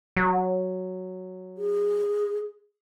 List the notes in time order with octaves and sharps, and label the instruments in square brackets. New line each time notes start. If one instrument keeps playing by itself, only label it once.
[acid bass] F#3
[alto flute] G#4